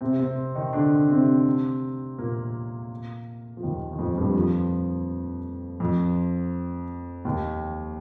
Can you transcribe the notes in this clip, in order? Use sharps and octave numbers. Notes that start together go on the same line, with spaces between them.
C3 C4
C3 C4
D#3 D#4
D3 D4
C3 C4
A#2 A#3
F3
D#2 D#3
D#3
F2 F3
G2 G3
F2 F3
F2 F3
D#2 D#3